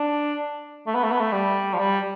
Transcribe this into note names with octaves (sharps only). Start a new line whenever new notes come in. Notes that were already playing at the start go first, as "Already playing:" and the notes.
Already playing: D4
A3
B3
A3
B3
A3
G3
F3
G3